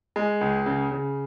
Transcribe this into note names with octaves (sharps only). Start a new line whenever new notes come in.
G#3
C#2
C#3
C#3